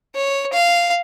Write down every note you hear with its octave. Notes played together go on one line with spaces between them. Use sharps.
C#5
F5